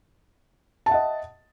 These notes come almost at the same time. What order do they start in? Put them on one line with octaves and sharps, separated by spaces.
A5 E5 F#5 D#5